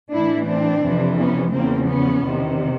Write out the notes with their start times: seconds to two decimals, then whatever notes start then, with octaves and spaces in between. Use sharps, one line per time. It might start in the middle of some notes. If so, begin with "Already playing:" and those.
0.12 A2 E3 D4 E4
0.47 C4 D4
0.83 F2 C3 E3
1.18 B3 C#4
1.52 E2 C#3 F3 A#3 C4
1.87 B3 C#4
2.23 E2 C3 D#3